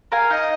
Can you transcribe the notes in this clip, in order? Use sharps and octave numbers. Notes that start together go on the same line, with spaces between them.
A#4 F5 G#5
D#4 D#5